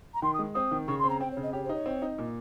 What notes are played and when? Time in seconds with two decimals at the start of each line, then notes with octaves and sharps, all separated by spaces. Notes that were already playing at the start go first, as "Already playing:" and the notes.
0.14 A#5
0.22 D#3 C6
0.34 D#6
0.39 G#3
0.55 C4 D#6
0.71 D#3
0.88 C#3 C#6
0.99 C6
1.04 C4
1.09 A#5
1.20 C4 G5
1.31 C#5
1.37 C#3
1.43 D#5
1.53 G4 C#5
1.64 C5
1.69 D#4 C#5
1.86 C4
2.02 D#4
2.18 A#2